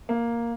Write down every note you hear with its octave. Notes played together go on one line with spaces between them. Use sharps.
A#3